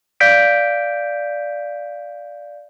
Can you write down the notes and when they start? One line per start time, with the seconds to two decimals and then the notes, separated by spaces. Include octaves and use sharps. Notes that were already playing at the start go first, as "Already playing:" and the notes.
0.20 D5 F5 G6 B6 D7